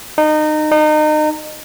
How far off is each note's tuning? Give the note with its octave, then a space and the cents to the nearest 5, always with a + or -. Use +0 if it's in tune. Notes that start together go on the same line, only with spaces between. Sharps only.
D#4 -25
D#4 -30